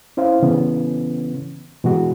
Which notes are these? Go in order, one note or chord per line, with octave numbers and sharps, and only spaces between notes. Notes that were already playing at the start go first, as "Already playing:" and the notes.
C#4 E4 C5 F5
C#3 E3 B3 C#4
B2 E3 G#3 F#4